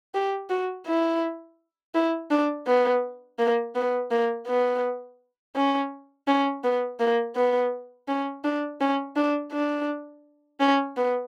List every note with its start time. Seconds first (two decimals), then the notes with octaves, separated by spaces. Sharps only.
0.14 G4
0.50 F#4
0.87 E4
1.95 E4
2.31 D4
2.67 B3
3.39 A#3
3.75 B3
4.11 A#3
4.47 B3
5.56 C#4
6.28 C#4
6.64 B3
7.00 A#3
7.36 B3
8.08 C#4
8.44 D4
8.80 C#4
9.16 D4
9.52 D4
10.60 C#4
10.97 B3